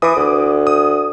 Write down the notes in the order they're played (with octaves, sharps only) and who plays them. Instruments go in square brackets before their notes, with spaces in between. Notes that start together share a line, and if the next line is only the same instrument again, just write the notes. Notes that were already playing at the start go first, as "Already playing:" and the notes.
[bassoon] E3 [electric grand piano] D6 D#6
[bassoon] D2
[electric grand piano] D#6